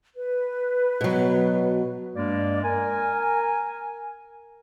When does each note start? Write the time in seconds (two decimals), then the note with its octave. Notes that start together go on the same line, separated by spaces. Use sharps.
0.15 B4
1.01 B2 F#3
2.16 G2 G#3 A#3 D5
2.64 A#4 G#5